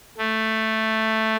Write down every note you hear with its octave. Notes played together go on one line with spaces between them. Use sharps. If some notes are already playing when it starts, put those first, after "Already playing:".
A3